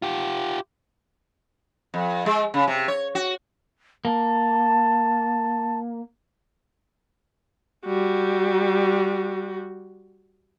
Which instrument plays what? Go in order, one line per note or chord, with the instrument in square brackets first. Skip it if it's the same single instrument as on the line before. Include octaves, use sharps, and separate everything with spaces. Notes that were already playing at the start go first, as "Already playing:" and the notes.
[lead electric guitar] F4 G4
[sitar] F2
G#3
C#3
C3
C#5
F#4
[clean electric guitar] A#3 [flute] A5
[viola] G3 F#4